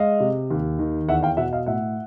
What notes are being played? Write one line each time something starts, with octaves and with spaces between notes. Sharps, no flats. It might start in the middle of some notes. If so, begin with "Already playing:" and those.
Already playing: G#3 D#5 F5
C3
D#2
D#3
E2 E5 F#5
F5 G5
B2 E5 F#5
D#5 F5
A2 E5 F#5